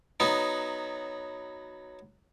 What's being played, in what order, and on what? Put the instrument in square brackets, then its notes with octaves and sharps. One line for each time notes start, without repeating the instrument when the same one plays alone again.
[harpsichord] F#3 B3 D#4